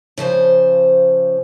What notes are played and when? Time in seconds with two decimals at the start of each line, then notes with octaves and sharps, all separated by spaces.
0.18 C#3 F3 C5 G#5